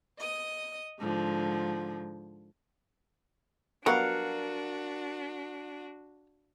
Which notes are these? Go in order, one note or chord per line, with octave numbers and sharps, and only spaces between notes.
D#5 D#6
G#2 D3 F3
F#3 G3 B3 D4 F#4 A#4 F5 F#5